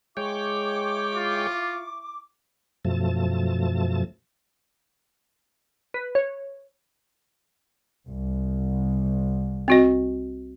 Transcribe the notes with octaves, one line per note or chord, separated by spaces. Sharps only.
G#3 E4 C#5 G5 C#6 D6
F4
F#2 B2 F3 A3 A5
B4
C#5
C2
C4 F#4 D#5